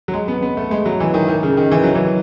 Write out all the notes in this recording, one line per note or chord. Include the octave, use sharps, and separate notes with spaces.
F#3
G#3
B3
B3
A3
G#3
F#3
E3
D#3
D#3
C#3
D#3
E3
F#3
E3